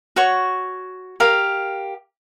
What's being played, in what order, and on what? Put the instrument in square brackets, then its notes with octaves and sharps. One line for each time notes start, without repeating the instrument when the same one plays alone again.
[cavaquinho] F#4 C#5 C#6
G4 A#4 F5